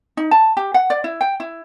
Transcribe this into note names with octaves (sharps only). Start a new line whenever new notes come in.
D#4
A5
G4
F#5
D5
E4
G5
E4